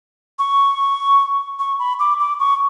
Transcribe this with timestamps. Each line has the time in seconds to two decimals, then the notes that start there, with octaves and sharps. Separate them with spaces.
0.39 C#6
1.59 C#6
1.79 B5
1.99 D6
2.20 D6
2.40 C#6